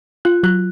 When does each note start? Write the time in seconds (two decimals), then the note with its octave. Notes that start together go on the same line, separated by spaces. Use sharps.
0.25 F4 F#6
0.43 F#3 F#6